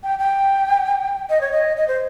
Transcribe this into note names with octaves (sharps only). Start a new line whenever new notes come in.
G5
G5
D#5
C#5
D#5
D#5
C5